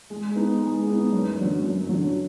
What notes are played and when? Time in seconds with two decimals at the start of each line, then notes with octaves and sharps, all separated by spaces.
0.10 G#3
0.36 B3 D#4
0.61 G#3
0.87 B3 D#4
1.12 F#2
1.38 D3 F#3
1.64 F#2
1.89 D3 F#3